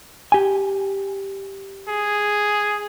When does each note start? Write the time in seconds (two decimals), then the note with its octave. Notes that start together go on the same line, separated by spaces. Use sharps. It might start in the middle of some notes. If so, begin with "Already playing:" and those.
0.32 G4 G#5
1.88 G#4